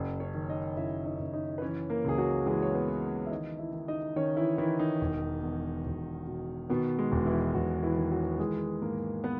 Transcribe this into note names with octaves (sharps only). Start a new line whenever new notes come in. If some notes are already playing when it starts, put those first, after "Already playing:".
Already playing: F#1
C#4 C#5
D#3
D#4 D#5
F#1 E4 E5
D#4 D#5
F#1
D#4 D#5
B4
E3 C#4 C#5
A#3 A#4
C#2 G#4
F#3 F#4
E3 G#3 G#4
C#5
B3 B4
E3
E5
D#3 D#4 D#5
E4 E5
D#3
D#4 D#5
D#3 C#4 C#5
E3 E4
D#3 E3 E4
D#3 D#4
E1
E2
E1
B2
B2 D#3 B3
G#3
E1
E3 E4
E1 F#3 F#4
E3 E4
D#3
F#3 F#4
E3 G#3 G#4
G#2 A#3 A#4
B3 B4